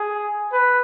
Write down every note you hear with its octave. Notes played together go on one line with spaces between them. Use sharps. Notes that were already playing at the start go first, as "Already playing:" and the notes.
Already playing: G#4
B4